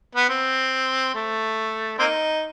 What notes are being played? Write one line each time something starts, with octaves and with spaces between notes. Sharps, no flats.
B3
C4
A3
A#3 C4 D#4